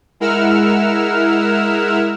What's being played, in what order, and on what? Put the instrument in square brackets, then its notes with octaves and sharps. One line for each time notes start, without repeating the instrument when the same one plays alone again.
[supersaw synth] G#3 E4 A#4 F#5 E6 F6